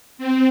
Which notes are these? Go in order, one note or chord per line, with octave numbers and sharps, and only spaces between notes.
C4